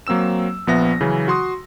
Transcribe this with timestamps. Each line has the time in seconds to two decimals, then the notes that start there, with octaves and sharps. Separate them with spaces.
0.07 F#3 A#3 C4 E6 E7
0.67 A#1 F3 B3 E5 A#6
1.01 C#3 E3 F#3 C#4
1.28 F#4 C6 D#6